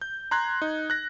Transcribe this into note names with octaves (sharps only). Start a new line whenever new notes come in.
G6
A#5 C6 F#6 G#6
D#4
F#6 A#6